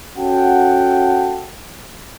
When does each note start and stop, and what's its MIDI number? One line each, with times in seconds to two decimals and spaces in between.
0.17 1.50 61
0.17 1.50 66
0.17 1.50 69
0.17 1.50 78
0.17 1.50 79
0.17 1.50 81